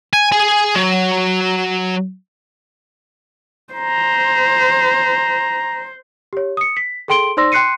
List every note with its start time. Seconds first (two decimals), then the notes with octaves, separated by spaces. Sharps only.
0.13 G#5
0.32 G#4 G#5
0.75 F#3
3.74 C5 A#5
6.33 G4 C#5
6.57 D#6 C#7
6.77 B6
7.08 G#4 A4 G5 C6 D7 G7
7.37 D#4 C5 D5 C6 E6 A#6
7.52 G5 C6 F#6 C7 C#7 D#7